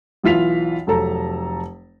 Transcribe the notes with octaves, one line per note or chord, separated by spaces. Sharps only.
B1 E3 F4 B6 F7
F1 F#3 A4 A5 A#5